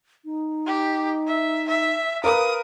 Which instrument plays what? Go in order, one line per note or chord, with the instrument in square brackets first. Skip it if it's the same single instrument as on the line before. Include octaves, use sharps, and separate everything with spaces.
[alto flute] D#4
[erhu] G4
E5
E5
[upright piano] A#4 B4 [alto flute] F5 [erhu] D#6